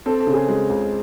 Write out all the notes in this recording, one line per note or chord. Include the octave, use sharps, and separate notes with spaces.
C4 A4
A4
C#3
G#4
G#3
C#2